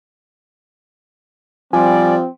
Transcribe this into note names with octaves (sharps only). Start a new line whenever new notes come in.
F3 G3 C4 D5 G#5